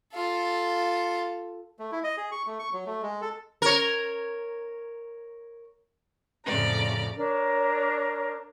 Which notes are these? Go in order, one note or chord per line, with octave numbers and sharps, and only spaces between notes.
F4 A4
A3
E4
D#5
G#4
C#6
A3
C#6
F#3
A3
G#3
A4
A#4 C#5
F2 A2 C#3 F3 D5 A#5
D4 A#4 C#5